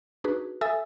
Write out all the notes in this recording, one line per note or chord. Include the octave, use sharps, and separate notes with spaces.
D4 D#4 F#4 G#4 B4
A4 E5 G#5 D#6 E6 A6